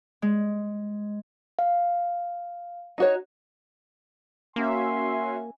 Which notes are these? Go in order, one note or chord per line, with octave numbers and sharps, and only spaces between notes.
G#3
F5
D#4 F#4 C#5
A#3 C#4 F#4 E5 G#5 C6